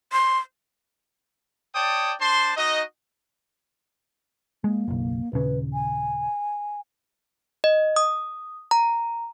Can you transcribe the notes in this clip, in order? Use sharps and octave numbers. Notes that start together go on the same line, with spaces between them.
C6
C#5 D5 G5 A5 D#6
D4 C5 A5 C6
D#4 F#4 D#5
G#3 A#3
F#1 B1
D#1 C#3 B4
G#5
D#5
D#6
A#5